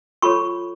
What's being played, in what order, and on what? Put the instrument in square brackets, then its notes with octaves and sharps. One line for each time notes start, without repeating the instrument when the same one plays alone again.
[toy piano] F4 A4 C#5 B5 C#6